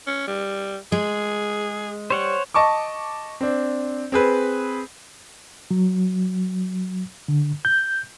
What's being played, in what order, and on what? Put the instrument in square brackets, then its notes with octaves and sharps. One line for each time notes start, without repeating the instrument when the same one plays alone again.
[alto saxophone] C#4
G3
[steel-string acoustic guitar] G#3 [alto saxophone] G#4
[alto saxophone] G3 [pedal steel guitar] C5 C#5 F#5
[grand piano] D#5 A5 C#6 D6
C4 D4
C4 G#4 B4
[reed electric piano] F#3
D3
G6